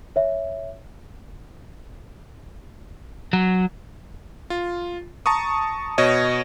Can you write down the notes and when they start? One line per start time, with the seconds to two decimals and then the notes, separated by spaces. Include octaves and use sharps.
0.16 C#5 E5
3.33 F#3
4.50 F4
5.26 A5 A#5 C#6 D#6
5.98 B2 C#5 D#5